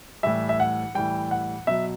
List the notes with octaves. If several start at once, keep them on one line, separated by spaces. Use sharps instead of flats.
A2 E3 G3 E5
E5
F#5
A2 E3 G3 G5
F#5
B2 F#3 E5